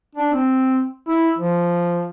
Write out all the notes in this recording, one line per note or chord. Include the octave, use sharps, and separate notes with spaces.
D4
C4
E4
F3